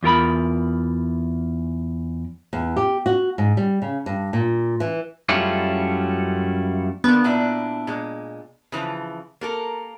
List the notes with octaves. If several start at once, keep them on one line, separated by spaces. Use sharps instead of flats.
E2 F4 A#4 B5
E2
G4
F#4
G#2
G3
C#3
G2
A#2
E3
F#2 G3 A3 C#4 E4 F4
D3 A#3 B3
A#2 D4 E4
A#2 G#3
C#3 E3 F3
A#3 A4 A#4